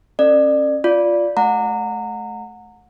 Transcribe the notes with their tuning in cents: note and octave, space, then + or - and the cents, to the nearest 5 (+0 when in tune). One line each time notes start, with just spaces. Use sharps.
C#4 -30 A4 +40 D5 +30
F4 +0 D5 -10
A3 -35 F#5 -25 A#5 -25